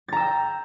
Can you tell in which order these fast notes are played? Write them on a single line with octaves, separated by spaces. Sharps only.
A6 A#5 E6 G5